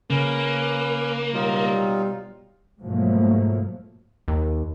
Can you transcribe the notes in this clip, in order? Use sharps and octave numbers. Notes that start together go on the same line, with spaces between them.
C#3 A#3 C#4 B4
B2 F#3 G3 D#4 F4
G#2 B2 F3 F#3 A3 A#3
D#2